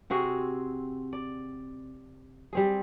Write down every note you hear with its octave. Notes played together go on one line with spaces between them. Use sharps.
C3 C4 F#4 G#4
D5
G3 C4 G#4